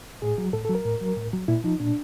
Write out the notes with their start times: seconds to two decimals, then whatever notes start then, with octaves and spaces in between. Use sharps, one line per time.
0.22 A2 G#4
0.38 F#3
0.53 A2 A4
0.65 A4
0.69 F#3
0.75 A#4
0.85 A2
1.01 F#3
1.16 A2
1.33 F#3
1.48 A#2 E4
1.64 F3 D#4
1.80 A#2 D4